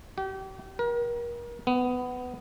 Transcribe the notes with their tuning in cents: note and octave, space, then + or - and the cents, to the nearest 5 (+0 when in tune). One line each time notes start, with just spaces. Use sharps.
G4 -35
A#4 +35
B3 +15